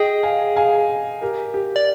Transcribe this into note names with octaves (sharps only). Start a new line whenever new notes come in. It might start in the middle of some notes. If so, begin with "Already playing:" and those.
Already playing: G#4 D#5 G5
F5 G#5
F5 G#5
G4 A#4
G4
D5